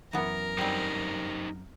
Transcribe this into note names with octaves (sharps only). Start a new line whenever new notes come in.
F#2 E3 B3 A#4
G3 C4 D#4 G4 C5